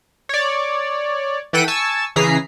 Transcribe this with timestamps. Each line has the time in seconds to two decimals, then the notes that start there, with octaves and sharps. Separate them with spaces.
0.29 C#5 D5
1.53 E3 A4 F#5 G5 B6 D#7
1.68 G#5 A5 C#6 E6
2.16 C#3 E3 G#4 A#5 B6 C7